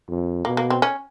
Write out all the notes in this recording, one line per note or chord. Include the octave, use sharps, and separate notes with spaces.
F2
B2 A#3
A#3
C4
C#4